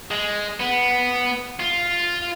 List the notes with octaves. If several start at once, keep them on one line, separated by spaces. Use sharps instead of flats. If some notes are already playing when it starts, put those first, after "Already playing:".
G#3
B3
F4